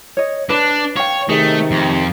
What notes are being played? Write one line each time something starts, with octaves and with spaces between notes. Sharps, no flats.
C#5 D#5
D4 B4
C#5 F5 G5
C3 D#3 A3 G#4
F2